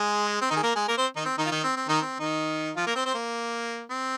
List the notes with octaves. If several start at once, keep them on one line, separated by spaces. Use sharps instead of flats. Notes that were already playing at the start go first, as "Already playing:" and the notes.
Already playing: G#3 G#4
C4
D#3 D#4
G#4
A#3 A#4
G#3 G#4
A#3 A#4
C4 C5
D#3 D#4
C4
D#3 D#4
F4
D#3 D#4
C4
C4
D#3 D#4
C4
D#3 D#4
F3 F4
A#3 A#4
C4 C5
C4 C5
A#3
C4